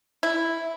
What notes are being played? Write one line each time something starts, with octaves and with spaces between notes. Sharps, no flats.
E4